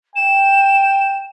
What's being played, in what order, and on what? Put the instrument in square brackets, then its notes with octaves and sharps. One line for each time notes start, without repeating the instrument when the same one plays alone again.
[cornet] G5 [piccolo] E7